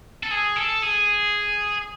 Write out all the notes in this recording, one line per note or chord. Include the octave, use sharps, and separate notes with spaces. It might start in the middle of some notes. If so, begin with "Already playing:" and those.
A4
G#4
A4
G#4